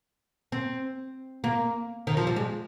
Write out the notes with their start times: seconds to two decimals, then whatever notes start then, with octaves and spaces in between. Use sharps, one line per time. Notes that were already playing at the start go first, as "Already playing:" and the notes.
0.52 C4
1.44 A#3
2.07 D#3
2.17 F3
2.27 G3
2.36 G#3